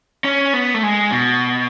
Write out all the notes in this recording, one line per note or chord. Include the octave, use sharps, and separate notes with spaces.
C#4
B3
A3
G#3
B2